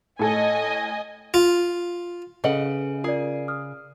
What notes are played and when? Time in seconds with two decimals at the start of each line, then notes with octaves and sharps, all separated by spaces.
0.19 A2 A4 D#5 G#5
1.34 F4
2.44 C#3 G#4 A4 B4 D#5 F#5 F#7
3.04 F4 G#4 A#4 D5
3.48 D#6 F6